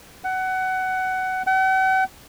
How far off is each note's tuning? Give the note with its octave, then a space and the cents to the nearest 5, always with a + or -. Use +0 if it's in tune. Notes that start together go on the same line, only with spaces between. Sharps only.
F#5 +20
F#5 +45